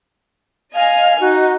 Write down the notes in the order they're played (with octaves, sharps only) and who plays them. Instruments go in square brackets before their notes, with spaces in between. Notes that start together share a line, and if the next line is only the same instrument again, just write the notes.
[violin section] D#5 G#5 F6 [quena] F5
[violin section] D#4 [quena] F#4